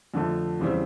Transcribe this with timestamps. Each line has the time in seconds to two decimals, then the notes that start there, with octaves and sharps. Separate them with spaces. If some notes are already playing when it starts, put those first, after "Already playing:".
0.14 F2 D3 F3 A3
0.60 E2 C#3 E3 G3 C4